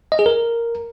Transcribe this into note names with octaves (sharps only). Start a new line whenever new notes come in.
D#5
G#4
A#4